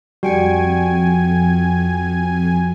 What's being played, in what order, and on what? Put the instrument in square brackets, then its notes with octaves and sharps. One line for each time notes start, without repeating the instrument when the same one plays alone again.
[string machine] F2 [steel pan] G3 [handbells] F#4 G5 C#7 [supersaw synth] G#5